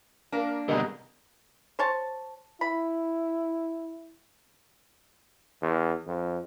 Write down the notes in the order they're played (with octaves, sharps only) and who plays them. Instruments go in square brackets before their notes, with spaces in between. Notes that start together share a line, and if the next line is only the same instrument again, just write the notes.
[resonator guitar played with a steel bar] A#3 D4 [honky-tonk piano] A#4
[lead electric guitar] B2 D3 [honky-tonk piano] G3 G#3 [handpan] A#4 D#5
[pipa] C5 C#5 A5
[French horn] E4 [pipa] B5
[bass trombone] E2
F2